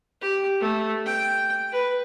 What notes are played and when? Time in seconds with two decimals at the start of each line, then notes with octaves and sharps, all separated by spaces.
0.21 G4
0.60 A3
1.06 G5
1.72 B4